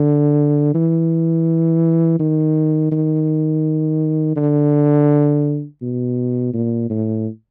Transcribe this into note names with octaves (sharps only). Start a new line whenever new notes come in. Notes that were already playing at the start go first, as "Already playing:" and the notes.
Already playing: D3
E3
D#3
D#3
D3
B2
A#2
A2